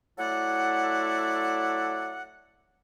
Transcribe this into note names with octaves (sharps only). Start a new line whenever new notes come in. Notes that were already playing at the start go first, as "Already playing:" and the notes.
F#3 A3 E4 A4 D5 F#5